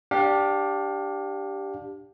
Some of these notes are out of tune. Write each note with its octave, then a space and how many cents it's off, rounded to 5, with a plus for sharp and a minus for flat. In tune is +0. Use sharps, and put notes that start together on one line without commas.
D4 +0 G4 +0 F5 +35